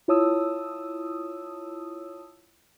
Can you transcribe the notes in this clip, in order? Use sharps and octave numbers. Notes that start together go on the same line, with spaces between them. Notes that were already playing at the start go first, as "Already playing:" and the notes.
E4 F4 C#5 A5 D#6 E6